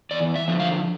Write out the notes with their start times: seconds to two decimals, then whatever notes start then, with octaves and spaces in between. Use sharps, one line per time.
0.11 E2 D5
0.36 E5
0.48 D3 F3
0.60 F5